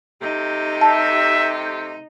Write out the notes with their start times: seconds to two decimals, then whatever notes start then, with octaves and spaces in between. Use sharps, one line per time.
0.22 C3 A3 D#4 G4
0.81 E5 A5